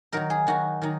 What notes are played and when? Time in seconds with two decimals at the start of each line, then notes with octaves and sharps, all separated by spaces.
0.12 D#3 F#3 D#4 A#4
0.30 G#4
0.47 D#3 F#3 D#4 F#4
0.81 D#3 F#3 D#4